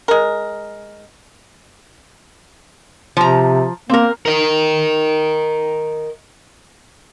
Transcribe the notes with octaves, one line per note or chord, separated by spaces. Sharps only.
G#3 A#4
C3 F3 A#5
A#3 C4 A#4
A#4 D#5